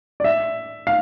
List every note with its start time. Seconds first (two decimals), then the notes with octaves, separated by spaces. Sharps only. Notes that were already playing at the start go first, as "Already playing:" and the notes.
0.20 D5
0.24 E5
0.87 F5